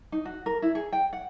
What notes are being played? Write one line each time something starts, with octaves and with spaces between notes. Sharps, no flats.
D#4
F#4
A#4
E4
G#4
G5
F#5